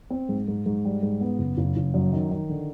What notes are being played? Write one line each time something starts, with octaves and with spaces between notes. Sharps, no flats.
C4
G#2
G#2
G#2
G3
G#2
B3
F#1
F#1
F#1
F#2
D#3
D#3
D3